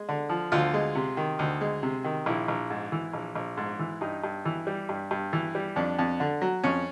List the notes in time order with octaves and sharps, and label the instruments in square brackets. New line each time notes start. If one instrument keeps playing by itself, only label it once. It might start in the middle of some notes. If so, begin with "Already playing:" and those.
Already playing: [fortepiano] G#3
D3
F3
D2 F4
G#3
C3
D#3
D2
G#3
C3
D#3
A#1 E4
A#1
G#2
E3
A#1
A#1
G#2
E3
G2 D#4
G2
E3
G3
G2
G2
E3
G3
F2 D4
F2
D3
F#3
F2 C#4